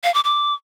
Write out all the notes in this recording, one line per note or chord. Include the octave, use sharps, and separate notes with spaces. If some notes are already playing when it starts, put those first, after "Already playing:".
F5
D6
D6